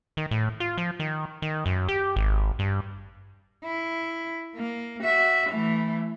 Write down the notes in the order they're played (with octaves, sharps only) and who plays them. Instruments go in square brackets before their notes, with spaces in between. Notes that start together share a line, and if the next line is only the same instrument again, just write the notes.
[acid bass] D#3
A2
F4
F3
D#3
D#3
F#2
G4
G#1
G2
[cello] E4
A#3
F#4 E5
E3 A3